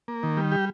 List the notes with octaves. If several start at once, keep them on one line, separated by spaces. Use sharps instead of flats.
A#3
D#3
G3
G4